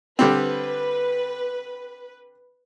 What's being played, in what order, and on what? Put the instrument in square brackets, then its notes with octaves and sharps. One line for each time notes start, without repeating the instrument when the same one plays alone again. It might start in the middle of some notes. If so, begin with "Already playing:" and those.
[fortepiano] D3 G3 C4 [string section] B4